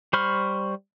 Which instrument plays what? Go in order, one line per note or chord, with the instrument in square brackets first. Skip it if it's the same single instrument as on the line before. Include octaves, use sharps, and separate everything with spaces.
[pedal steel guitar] G3 C5 B5 C#6 F6